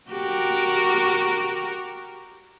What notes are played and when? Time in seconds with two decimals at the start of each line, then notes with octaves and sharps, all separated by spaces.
0.11 F#4 G4 A#4